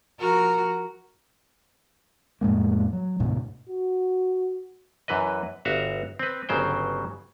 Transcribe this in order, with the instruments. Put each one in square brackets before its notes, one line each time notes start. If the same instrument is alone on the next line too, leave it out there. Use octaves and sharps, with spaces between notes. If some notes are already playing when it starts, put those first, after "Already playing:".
[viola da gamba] F3 F#4 A#4
[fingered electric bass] F2 A2 G#3 A#3
F#3
D2 G#2 B2
[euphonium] F#4
[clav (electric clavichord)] F#2 E3 B4 D#5
G1 F#4 E5 F5
C4 B4
G1 C#3 F#3 C5 G5